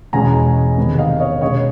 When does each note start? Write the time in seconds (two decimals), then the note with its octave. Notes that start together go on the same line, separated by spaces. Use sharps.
0.13 E2 B2 G#3 C#4 G#5 A#5
0.77 C3 D#3 G#3 B3
0.98 D#5 F5
1.20 C#5 D#5
1.41 B2 G#3 C#4 C#5 D#5